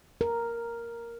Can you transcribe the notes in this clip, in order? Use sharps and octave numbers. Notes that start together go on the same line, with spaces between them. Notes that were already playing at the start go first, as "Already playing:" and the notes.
A#4